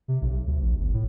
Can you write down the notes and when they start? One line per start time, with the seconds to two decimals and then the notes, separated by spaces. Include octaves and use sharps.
0.08 C3
0.22 B1
0.46 D2
0.61 A#1
0.79 G1
0.93 A2